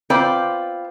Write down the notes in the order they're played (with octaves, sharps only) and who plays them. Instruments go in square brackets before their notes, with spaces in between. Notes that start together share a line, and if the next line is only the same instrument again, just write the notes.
[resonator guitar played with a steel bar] C4 F4 B4 D5